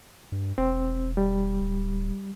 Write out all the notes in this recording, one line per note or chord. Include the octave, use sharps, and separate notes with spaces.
G2
E1 C4
G3
D1